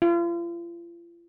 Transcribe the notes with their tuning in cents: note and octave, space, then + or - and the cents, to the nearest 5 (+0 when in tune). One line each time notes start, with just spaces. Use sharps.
F4 -40